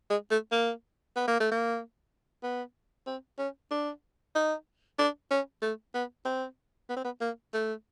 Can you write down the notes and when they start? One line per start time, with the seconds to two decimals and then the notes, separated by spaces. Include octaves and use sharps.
0.10 G#3
0.31 A3
0.52 A#3
1.16 B3
1.28 A#3
1.40 A3
1.51 A#3
2.43 B3
3.07 C4
3.39 C#4
3.71 D4
4.35 D#4
4.99 D4
5.31 C#4
5.62 A3
5.94 B3
6.25 C4
6.90 B3
6.97 C4
7.05 B3
7.21 A#3
7.54 A3